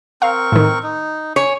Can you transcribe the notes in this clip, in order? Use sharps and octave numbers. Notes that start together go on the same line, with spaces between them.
C4 A#4 F5 C#6
A2 D#3
D#4
C#5 G#5